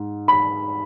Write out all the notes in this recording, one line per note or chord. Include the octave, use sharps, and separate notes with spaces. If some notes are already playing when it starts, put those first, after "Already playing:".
Already playing: G#2
B5